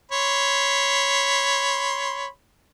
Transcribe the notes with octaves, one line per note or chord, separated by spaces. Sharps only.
C#5 B5 C6